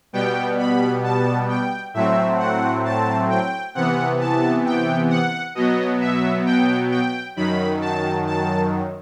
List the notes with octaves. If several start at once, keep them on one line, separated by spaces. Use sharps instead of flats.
B2 G3 B3 G5
B5
A5
G5
A2 F#3 A3 C4 E5
F#5
A5
G5
C3 E3 B3 F#5
A5
G5
F#5
B2 F#3 B3 D#5
E5
G5
G5
F#2 D#3 F#3 B5
A5
A5